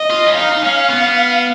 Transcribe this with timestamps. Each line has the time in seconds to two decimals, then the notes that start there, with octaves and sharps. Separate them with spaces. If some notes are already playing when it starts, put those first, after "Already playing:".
Already playing: D#5
0.10 F4
0.27 C#4
0.37 D#4 F5
0.52 D#4
0.64 C#4
0.90 B3